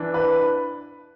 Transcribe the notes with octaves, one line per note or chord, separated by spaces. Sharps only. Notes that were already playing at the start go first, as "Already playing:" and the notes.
Already playing: E3 D4
B4